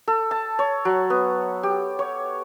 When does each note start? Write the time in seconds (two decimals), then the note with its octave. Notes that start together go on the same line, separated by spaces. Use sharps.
0.07 A4
0.31 A5
0.59 C#5
0.85 F#3
1.10 B3
1.63 G4
1.99 C#5